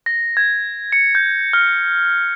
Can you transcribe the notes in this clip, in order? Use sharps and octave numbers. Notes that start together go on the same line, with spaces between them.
A#6
G#6
C#7
G6
F6